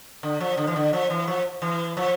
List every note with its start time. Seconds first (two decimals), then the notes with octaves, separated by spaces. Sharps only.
0.23 D3
0.40 F3
0.57 D3
0.67 E3
0.76 D3
0.93 F3
1.10 E3
1.27 F3
1.62 E3
1.97 F3